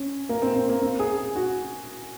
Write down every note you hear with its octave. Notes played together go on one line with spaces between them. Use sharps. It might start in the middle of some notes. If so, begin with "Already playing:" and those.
Already playing: C#4
A#3
C4
C4
A#3
C4
G#4
G#4
F#4